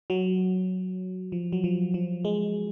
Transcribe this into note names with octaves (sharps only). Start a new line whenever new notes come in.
F#3
F3
F#3
F3
F3
G#3